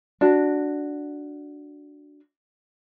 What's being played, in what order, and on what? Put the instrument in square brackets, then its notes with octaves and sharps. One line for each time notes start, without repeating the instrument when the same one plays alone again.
[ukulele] D4 F#4